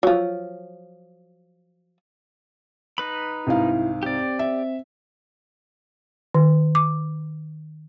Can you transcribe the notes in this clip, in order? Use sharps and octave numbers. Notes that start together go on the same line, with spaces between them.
F3 F#3
D#4 B4 B5
C2 G#2 E4 F5
C4 G4 D5
E5
D#3
D6